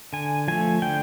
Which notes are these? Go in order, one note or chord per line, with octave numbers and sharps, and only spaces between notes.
D3 G#5
F3 A3 G#5
D3 G5